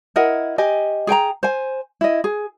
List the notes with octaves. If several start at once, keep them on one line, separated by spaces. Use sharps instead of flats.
E4 A#4 D#5 F#5
G4 D#5 G#5
G#4 G5 G#5 A#5
C5 G#5
E4 D#5
G#4